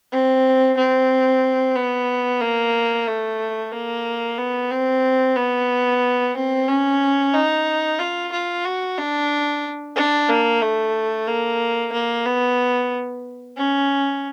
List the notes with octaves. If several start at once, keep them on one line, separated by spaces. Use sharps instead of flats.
C4
C4
B3
A#3
A3
A#3
B3
C4
B3
C4
C#4
D#4
F4
F4
F#4
D4
D4
A#3
A3
A#3
A#3
B3
C#4